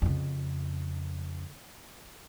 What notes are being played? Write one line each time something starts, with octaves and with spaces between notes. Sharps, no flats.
F2 C#3